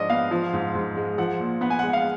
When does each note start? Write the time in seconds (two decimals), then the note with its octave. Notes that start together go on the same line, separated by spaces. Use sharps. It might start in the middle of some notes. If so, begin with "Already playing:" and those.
Already playing: G#2 F3 D4 D#5
0.10 B3 F5
0.31 F3
0.53 G#2
0.75 G#2
0.97 G#3
1.18 F3 F#5
1.40 A#2
1.61 B3 F#5
1.70 G#5
1.79 F#5
1.83 G#3
1.93 F5